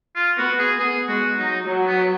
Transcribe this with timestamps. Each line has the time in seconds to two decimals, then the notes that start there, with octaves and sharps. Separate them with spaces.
0.16 F4
0.38 B3 F#4
0.59 G#4
0.79 B3 G#4
1.08 G#3 F#4
1.37 F#3 D#4
1.66 F#3
1.87 B3